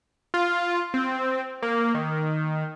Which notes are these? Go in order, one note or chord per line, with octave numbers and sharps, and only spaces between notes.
F4
C4
A#3
D#3